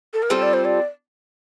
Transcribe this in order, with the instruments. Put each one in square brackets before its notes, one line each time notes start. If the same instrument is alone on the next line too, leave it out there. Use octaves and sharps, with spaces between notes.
[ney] A4
A#4
[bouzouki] G3 C4 F4 A4 [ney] C5
[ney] D5
C5
D5